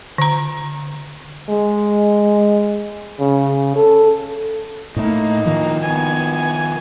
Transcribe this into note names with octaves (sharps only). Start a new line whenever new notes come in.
D3 A#5
G#3
C#3
A4
A2 A3 A#3 D#4
D#3 F3
B3 G#5